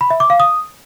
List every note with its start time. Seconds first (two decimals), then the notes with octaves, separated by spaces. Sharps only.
0.01 B5
0.10 E5
0.20 D6
0.30 F5
0.40 D#6